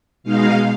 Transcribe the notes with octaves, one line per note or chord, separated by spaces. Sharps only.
B2 G#3 D#4 F5